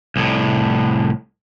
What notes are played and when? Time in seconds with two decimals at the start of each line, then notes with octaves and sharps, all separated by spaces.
0.16 C2 A2